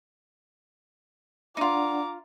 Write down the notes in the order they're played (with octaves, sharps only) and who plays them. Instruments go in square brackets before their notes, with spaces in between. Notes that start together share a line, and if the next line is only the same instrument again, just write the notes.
[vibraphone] D4 D5 F#5 [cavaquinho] D#4 F4 [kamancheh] A#5 D6